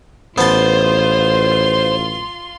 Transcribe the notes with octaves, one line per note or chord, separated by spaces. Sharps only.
A1 B3 F4 C5 A5 C6